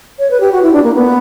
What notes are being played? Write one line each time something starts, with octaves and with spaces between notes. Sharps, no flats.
C#5
B4
G4
F#4
E4
D4
A#3
B3